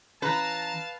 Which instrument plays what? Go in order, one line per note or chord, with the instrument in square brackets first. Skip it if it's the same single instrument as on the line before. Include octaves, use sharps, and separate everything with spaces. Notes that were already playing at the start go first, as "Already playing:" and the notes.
[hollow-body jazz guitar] E3 C#4 [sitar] B4 [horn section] F5 A5 [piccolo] A#5